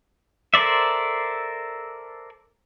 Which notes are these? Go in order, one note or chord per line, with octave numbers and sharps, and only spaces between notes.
A4 A#4 C5 D5 E5